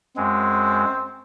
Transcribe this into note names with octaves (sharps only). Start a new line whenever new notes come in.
F#2 G#3 C4